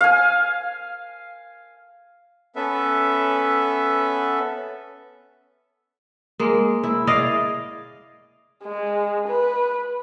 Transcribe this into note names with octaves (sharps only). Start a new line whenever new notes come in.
F5 G#5
B3 C#4 A4 B4 E5
G#3 A#3
E4
G#4 D5 D#5 F5
G#3
B4